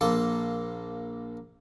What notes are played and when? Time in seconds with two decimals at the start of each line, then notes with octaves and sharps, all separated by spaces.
0.01 A#1 A#3 A4 C6